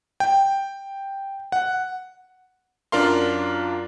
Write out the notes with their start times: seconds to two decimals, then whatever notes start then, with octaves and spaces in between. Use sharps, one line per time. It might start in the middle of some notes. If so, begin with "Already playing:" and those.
0.20 G5
1.52 F#5
2.92 F#2 D4 F4 A#4 F5 C6